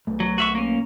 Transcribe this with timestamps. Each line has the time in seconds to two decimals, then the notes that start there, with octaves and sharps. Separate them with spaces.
0.07 B1 A3
0.20 F#3
0.38 F#4 E5 C#6
0.55 A#3 C#4